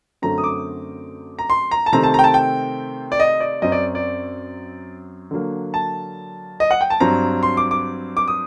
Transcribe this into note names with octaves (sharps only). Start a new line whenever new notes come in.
F#2 D3 F#3 A3 C4 A#5
D#6
D6
A#5
C6
A#5
A5
C3 D#3 A3 C4 A#5
A5
G5 A#5
A5
G5
D5
D#5
D5
F#2 F#3 C4 D#5
D5
D5
D3 F#3 A#3
A5
D#5
F#5
G5
A5
G2 F#3 C4 A#5
C6
D6
D6
D6
D#6